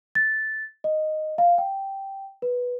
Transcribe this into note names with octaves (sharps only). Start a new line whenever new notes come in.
A6
D#5
F5
G5
B4